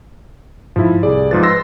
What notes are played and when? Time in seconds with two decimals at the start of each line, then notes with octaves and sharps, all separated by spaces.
0.76 G#2 F3 E4
1.03 C2 G#4 D5
1.31 G#2 F3 B4 A6
1.43 C6 E6 A#6